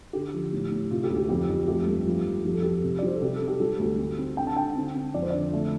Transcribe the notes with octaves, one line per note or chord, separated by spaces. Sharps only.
D3 G4
F3
A2
A2
C3 F4
G4
D2
G4
F2 G4
F2
A3 G4
G2
F3
F3
F2 G4
A4
F3 G4
C3
D5
G3 C5
A4
C3 G4
A4
C4
G4
G3 A4
D2
C4
C4
D3 G5
A5
D3 G5
C4
C4
F2 D5
C5
D3 D5
A3